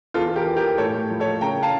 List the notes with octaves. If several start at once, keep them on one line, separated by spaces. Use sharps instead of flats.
E2 F4 A4
E2
G4 A#4
E3
G4 A#4
A#3
A2 A4 C#5
A2
F3
A4 C#5
A#3
C#3 G5 A#5
C#3
F5 A5